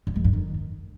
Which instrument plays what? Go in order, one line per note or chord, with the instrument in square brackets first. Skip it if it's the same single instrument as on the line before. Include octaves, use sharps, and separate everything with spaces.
[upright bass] F#2
F2
G2
D#3